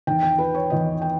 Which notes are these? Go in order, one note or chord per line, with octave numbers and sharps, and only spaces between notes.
E2 D#3 G5
G5
B4
C#5
E2 D#3 D#5
G5